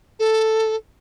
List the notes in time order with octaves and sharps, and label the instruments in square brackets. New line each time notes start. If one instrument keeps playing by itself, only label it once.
[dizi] A4